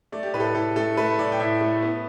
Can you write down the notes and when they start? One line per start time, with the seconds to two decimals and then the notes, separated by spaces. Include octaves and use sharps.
0.12 A3 D5
0.23 G4
0.34 A2 B4
0.40 A4
0.44 B4
0.55 A2 A4
0.76 A3 A4
0.97 A3 B4
1.19 A2 D5
1.32 G5
1.40 A2 E5
1.61 A3
1.82 B3